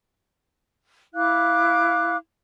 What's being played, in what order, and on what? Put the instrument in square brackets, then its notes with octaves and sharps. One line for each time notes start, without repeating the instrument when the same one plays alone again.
[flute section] E4 F5 D6 F#6